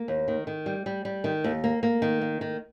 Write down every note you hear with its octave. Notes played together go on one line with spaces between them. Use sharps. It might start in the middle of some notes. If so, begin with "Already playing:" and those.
Already playing: A#3
D#2
D#3
D#3
G3
G3
G3
D#3
D#2
A#3
A#3
D#3
A#3
D#3